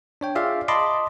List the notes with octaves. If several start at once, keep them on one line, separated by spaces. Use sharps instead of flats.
D4 C#5 G5
F4 G#4 D5 E5 F5
D#5 A5 B5 C6 D6